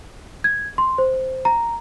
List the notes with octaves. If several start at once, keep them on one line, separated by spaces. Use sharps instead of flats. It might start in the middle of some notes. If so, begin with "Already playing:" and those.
G#6
C6
C5
A#5